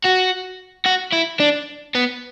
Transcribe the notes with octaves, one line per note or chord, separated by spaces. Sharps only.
F#4
F#4
E4
D4
B3